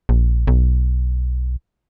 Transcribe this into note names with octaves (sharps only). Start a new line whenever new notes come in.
A#1
B1